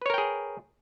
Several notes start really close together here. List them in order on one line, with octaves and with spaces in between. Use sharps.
B4 C#5 A#4 G5 G#4